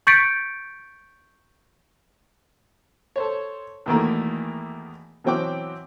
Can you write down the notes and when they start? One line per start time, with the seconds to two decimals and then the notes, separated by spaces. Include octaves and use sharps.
0.07 C#6 G6 A6 B6 C#7 D7
3.16 A4 C5 C#5
3.86 E2 B2 D#3 E3 A3 A#3
5.24 B2 E3 F#3 C4 G5 D6